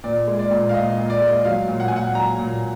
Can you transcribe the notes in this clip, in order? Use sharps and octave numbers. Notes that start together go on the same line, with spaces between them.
A#2 D5
G#3
D5
A#2
F5
A#2 D#5
D#5
A#2
D5
G#3
D#5
F#3 F5
A#2
F#5
G#5
A#2 F#5
F#3 A#5
A#2